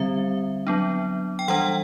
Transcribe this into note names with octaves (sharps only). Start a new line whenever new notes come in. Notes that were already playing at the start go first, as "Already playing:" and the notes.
Already playing: D3 G3 C4 E5
F#3 B3 D4
G5
E3 G3 D4 F#5